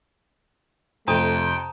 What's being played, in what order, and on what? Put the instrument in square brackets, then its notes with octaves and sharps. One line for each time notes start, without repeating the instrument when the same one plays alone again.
[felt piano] F2 C3 [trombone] A3 [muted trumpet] G5 [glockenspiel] A5 A#5 D#6